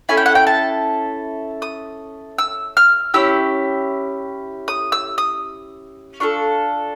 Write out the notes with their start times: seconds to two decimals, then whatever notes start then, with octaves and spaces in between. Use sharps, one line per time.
0.09 C#4 E4 A4 G#5
0.17 G5
0.26 F#5
0.35 G5
0.47 A5
1.62 D#6
2.38 E6
2.77 F6
3.14 C#4 E4 G4 E6
4.68 D#6
4.92 E6
5.18 D#6
6.20 D4 F4 A4 C#6